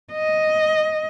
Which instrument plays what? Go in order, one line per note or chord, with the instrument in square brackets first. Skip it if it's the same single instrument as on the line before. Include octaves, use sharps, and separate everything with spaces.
[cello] D#5